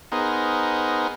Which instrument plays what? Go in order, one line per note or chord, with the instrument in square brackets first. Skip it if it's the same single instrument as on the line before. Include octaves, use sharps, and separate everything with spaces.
[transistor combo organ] B3 D#4 G#4 A#4 C5